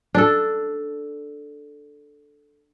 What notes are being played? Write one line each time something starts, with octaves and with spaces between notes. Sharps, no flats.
D4 A4